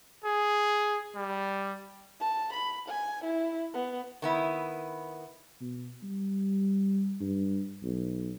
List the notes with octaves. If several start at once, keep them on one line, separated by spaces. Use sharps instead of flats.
G#4
G3
A5
B5
G#5
E4
B3
D#3 B3 E4
B2
G3
G2
B1